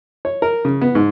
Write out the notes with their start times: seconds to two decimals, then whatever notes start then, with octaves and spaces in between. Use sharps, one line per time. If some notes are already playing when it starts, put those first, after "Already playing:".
0.25 C#5
0.42 A#4
0.65 C#3
0.81 B3
0.95 G#2